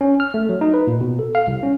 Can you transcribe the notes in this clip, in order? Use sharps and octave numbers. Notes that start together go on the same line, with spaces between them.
C#4
F6
A3
F#3
D#4
B4
A#2
B2
A4
F5
C2
C#4